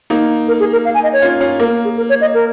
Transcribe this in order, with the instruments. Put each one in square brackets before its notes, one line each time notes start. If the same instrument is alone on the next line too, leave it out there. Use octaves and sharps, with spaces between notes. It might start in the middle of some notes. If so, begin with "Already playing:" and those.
[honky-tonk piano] A#3 D#4
[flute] A#4
G#4
A#4
F5
G#5
D#5
C#5
[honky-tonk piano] C#4 F4
C#4 F4
[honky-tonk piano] A#3 [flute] A#4
[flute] G#4
A#4
C#5
D#5
A#4